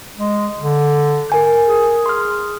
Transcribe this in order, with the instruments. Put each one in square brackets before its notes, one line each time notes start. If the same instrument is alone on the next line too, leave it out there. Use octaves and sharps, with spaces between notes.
[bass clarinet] G#3
D3
[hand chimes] A#4 G#5 G6
[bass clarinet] G#4
[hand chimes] C6 F6